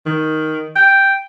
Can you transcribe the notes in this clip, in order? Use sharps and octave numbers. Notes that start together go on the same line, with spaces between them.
D#3
G5